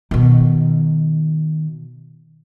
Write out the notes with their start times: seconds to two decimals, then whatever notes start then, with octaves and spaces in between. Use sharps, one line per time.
0.11 B2 D#3